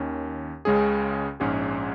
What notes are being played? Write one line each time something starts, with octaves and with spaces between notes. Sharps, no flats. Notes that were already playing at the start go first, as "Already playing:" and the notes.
Already playing: D#2 D#3 C#4
C#2 C#3 G#3 C#4 G#4
A#1 G#2 G#3 C#4 G#4